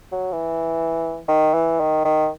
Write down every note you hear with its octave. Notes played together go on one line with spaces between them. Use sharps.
F#3
E3
D#3
E3
D#3
D#3